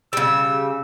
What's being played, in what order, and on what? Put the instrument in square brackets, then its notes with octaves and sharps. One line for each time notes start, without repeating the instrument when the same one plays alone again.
[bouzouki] C#3 G3 [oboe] E6